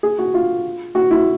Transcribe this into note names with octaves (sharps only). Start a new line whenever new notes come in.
G#4
F#4
F4
F#4
E4